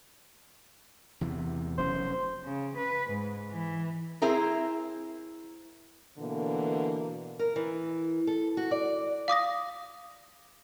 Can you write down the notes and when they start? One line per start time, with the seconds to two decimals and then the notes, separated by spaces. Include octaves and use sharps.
1.21 E2 C3 E3
1.78 F1 F#3 C#4 C5
2.44 C#3
2.77 B4
3.10 G#2
3.50 E3
4.22 C4 E4 G#4 A#4
6.18 B2 D3 E3 A#3
7.39 A#4
7.56 E3
8.27 A4
8.57 F#4
8.71 D5
9.28 F5 D6 D#6 A#6